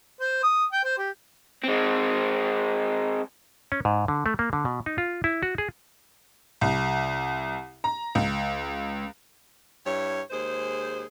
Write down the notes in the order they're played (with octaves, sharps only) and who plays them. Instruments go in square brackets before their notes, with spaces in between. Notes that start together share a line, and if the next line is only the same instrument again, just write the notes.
[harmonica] C5
D#6
G5
C5
G4
[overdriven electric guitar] G#3 C4
[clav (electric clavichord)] C#4
G#2
D3
A3
A#3
D3
B2
D#4
F4
E4
F#4
G#4
[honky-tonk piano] C2
A#5
C#2
[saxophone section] G2 E4 C#5
D#2 G#3 G#4 C5